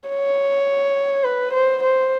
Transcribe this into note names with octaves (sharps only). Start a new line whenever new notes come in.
C#5
B4
C5
C5